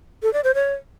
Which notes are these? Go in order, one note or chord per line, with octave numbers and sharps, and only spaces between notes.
A4
D5
C5
C#5